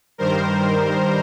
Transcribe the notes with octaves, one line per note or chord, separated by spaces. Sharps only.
G2 D#3 G3 A#4 C5